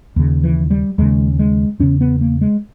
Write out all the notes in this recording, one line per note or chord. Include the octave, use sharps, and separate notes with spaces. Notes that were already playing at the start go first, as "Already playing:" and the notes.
D#2 C#3
E3
G3
D#2 C#3 G#3
G#3
E2 C#3 C#4
B3
A#3
G#3